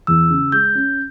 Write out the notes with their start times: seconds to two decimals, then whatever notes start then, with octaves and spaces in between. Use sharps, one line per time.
0.07 E2 E6
0.30 C#3
0.52 G#3 G6
0.75 C#4